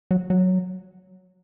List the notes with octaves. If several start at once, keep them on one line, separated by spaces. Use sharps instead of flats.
F#3
F#3